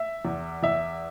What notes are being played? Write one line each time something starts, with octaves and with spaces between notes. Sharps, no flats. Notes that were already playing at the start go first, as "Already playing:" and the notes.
Already playing: E5
E2
E2 E5